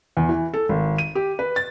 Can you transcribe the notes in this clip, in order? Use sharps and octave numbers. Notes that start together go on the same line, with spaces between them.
E2
E3
A4
G#1
D#7
G4
B4
A6